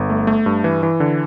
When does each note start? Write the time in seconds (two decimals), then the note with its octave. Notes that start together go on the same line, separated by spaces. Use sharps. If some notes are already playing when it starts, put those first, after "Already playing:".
Already playing: G1
0.10 A3
0.27 A3
0.46 G2
0.64 E3
0.83 E3
1.00 D3